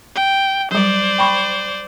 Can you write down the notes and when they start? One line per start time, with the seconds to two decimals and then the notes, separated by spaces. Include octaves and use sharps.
0.15 G5
0.71 F#3 G3 C5 D5
1.18 G5 B5 C#6